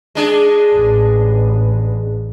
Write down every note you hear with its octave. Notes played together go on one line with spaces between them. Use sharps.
G#3 D4 G#4
A1